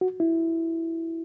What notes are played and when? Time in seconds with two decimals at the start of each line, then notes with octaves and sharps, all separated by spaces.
0.01 F#4
0.20 E4